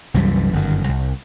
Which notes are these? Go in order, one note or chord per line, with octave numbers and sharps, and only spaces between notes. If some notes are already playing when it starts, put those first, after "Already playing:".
C2 F#2 E3 G3
G1 F#2 D#3
C2